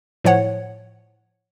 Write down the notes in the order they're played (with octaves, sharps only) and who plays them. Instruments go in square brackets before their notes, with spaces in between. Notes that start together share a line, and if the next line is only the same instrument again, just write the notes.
[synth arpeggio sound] A2 F3 C#5 F#5